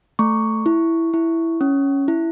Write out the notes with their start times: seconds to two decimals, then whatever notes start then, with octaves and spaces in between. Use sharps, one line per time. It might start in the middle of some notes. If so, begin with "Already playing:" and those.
0.19 A3 C#6
0.66 E4
1.14 E4
1.61 C#4
2.08 E4